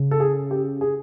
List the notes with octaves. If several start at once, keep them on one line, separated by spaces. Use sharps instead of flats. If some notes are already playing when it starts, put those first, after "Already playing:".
Already playing: C#3
A4
G#4
G4
G#4